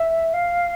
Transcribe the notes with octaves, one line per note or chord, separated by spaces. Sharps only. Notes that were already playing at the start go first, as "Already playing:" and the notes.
Already playing: E5
F5